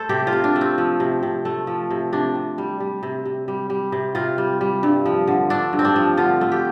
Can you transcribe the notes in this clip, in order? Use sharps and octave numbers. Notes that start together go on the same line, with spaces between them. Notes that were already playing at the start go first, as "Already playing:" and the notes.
Already playing: A3 A4 C5
C3 G4
F4
C3
D4
A3
C4
F3
C3
C3
A3
F3
C3
C3 D4
C3
G3
G3
C3
C3
G3
G3
C3
C3 F4
G3
G3
G2
F3
D3
A3 D4
G2
C4
D4
F3
D3 F4
A3
G4